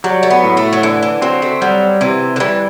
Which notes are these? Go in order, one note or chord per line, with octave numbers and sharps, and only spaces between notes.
F#3 G3
A3
B3
A2
A3
F#3
D3 E3
E3
F#3 C4
A3
F#3 G3
C3 E3
D3
E3 G3